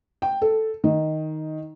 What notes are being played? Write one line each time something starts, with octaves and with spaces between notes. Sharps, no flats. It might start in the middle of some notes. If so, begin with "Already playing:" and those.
G5
A4
D#3